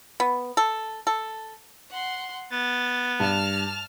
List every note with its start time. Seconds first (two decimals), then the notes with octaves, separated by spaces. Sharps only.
0.20 B3
0.57 A4
1.07 A4
1.91 F#5 C6
2.52 B3 A6
3.20 G2 A5 F6